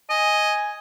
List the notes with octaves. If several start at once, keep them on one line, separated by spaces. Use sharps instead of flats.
D#5 G#5